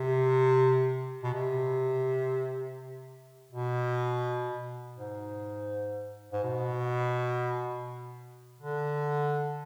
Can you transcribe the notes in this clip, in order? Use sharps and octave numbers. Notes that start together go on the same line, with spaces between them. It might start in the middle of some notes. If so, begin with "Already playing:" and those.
Already playing: C3
B2
C3
B2
G#2
G#2
B2
D3